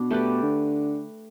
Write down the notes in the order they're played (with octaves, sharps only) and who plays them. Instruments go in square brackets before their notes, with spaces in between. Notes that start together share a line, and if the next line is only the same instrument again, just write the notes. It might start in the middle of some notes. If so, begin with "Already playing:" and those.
Already playing: [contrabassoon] B2 [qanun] D4
[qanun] A3 G4 B4 D5
[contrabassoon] D3